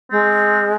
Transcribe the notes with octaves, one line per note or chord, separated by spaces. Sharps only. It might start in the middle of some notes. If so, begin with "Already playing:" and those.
G#3 C4